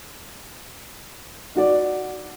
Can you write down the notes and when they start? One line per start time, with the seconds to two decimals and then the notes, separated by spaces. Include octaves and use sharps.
1.55 D#4 F#4 D5